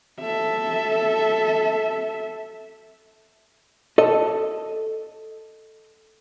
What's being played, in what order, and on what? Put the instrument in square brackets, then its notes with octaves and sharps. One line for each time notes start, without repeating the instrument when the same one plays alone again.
[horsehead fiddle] A4 E5
[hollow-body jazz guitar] A4 D#5